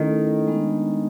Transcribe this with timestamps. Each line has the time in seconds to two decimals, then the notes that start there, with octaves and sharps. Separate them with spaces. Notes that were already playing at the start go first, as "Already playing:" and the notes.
Already playing: D#3 A3 C#4 E4 A4
0.47 G#3 B3 D4